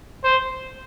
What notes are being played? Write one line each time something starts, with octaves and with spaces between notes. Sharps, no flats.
C5